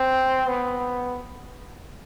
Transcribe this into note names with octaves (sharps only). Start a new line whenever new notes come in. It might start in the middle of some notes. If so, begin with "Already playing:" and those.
Already playing: C4
B3